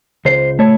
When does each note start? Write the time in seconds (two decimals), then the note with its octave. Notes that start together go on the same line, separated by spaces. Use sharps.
0.25 C#2 C5
0.59 A3 C#5